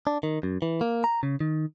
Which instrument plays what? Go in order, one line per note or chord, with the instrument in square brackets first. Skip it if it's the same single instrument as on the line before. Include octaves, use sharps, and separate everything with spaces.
[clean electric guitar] D4
D#3
F#2
E3
A#3
A#5
C#3
D#3